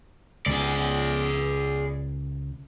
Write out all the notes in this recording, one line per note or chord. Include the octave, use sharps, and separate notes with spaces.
C#2 G#4 D5